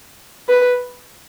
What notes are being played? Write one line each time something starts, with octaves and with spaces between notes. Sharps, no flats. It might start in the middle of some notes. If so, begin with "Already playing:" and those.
B4